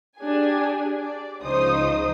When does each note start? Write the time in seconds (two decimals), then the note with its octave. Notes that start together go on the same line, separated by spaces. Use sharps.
0.18 D4 G4 G#4 G#5
0.99 D5
1.42 C#2 C#3 F3 D#4 C5 D#6